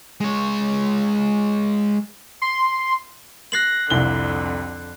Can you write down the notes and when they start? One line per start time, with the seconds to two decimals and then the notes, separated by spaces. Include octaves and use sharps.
0.21 G#3 C#5
2.42 C6
3.52 F#6 A#6 C7 F#7
3.90 C2 F2 D3 G7